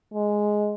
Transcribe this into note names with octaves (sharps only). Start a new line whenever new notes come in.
G#3